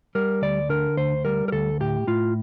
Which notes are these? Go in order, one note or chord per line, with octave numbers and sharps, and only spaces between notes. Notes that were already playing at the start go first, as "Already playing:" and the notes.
G3 A#4
D2 D5
D3 A#4
D2 C5
G3 A#4
A#4
D2 A4
A2 G4
A2 F4